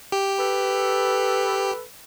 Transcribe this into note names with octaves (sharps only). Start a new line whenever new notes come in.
G4
A4 B4